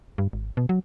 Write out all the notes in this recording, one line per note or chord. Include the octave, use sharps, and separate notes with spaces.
G2
G#1
B2
F#3